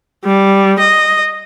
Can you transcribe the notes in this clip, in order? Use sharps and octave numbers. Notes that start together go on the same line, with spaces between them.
G3
D#5